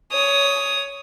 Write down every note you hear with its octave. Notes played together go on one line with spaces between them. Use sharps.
C#5 D#6